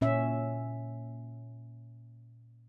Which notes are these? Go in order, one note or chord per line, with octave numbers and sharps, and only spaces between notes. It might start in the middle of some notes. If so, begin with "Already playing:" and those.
A#2 C#4 E5